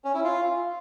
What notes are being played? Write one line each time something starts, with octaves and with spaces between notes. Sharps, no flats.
C#4
E4
F4